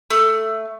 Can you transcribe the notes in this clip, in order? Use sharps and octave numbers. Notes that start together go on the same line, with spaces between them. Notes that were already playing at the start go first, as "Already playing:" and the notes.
A3